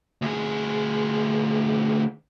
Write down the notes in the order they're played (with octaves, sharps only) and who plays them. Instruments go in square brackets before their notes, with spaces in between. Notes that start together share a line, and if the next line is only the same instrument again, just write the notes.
[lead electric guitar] D2 G#4